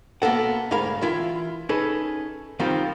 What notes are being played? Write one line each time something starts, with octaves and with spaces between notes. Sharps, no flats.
B1 A#3 B3 A4 F#5
D2 G#2 G#4 A#4 F5 B5
E3 E4 F4
C#4 D#4 G#4 A4 B4
D#3 F3 G3 C4 F4